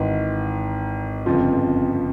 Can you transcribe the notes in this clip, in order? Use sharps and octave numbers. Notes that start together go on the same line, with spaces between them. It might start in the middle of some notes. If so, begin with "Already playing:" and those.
Already playing: G#1 G#2 E3
G1 F2 C#3 F3